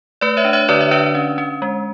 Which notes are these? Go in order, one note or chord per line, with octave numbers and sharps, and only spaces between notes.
A3 B4 D5
C#5 E5
D4
C#5 E5
D3 B4 D5
C#5 E5
D4 B4 D5
C#4
C#4
G#3